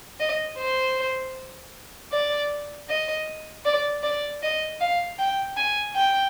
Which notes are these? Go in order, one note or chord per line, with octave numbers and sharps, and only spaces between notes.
D#5
C5
D5
D#5
D5
D5
D#5
F5
G5
G#5
G5